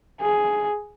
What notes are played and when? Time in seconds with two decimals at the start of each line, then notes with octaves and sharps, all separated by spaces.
0.21 G#4